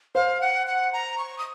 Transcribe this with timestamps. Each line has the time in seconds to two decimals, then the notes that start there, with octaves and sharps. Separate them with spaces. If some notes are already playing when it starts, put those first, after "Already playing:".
0.15 C5 F5
0.41 F#5
0.67 F#5
0.93 A#5
1.18 C#6
1.38 D#6